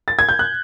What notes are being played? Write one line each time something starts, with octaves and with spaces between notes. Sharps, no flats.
A6
G#6
G6
F#6